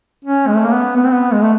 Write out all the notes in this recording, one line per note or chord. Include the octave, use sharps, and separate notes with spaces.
C#4
G#3
A3
A#3
B3
B3
C4
B3
G#3
A3